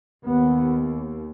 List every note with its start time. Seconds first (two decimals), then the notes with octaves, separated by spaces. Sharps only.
0.24 D#2 B3